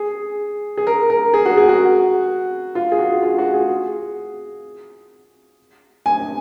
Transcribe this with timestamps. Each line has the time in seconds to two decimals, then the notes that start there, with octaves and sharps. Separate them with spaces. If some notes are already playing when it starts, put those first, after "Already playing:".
Already playing: G#4
0.77 G#4
0.87 A#4
1.10 A#4
1.34 G#4
1.46 F#4
1.57 G#4
1.69 F#4
2.75 F4
2.92 G#4
2.99 F#4
3.22 F4
3.38 F#4
3.54 G#4
6.06 G#5